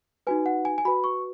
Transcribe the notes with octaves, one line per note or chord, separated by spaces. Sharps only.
D#4 F#4 B4 G#5
F#5
G#5
G#5
F#4 B4 B5
C#6